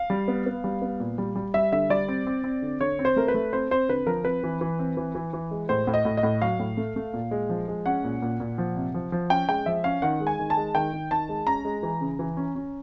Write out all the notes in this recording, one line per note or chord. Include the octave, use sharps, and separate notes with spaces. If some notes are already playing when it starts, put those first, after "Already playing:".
Already playing: F5
G3
B3
B3
G3
B3
A#2
G3
G3
G3 E5
D3 E5
G3 D5
C4
C4
C4
D3
D3 C#5
C4
C5
A3 A#4
B4
A3
C4 C5
C4 C5
D3 B4
F3 A#4
C4 B4
E3
E3
C4
E3
E3
E3
G#3
A2 C5
A2
D#5
A2
D#5
A2
F#3 F5
A2
A3
A3
A#2
G#3
F3
G#3
C#4 F#5
A#2
A#2
A#2
F3
C3
F3
F3
C#4 G5
G#3 G5
F3 E5
C#4 F5
D#3 F#5
G#3
G#5
D#3
A5
G#3
D#3 G5
D#3
D#3 A5
G#3
C#4 A#5
G#3
E3
C#3
E3
C#4
C#4